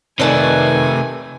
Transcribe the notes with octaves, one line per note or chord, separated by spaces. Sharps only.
C3 D#3 A3 B4 D5 G#5 A5